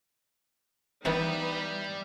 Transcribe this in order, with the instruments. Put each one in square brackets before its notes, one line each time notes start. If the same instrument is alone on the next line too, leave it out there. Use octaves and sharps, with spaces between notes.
[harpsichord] D#3 C4 [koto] E3 B3 [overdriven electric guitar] G3 [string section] D#4 B4 E5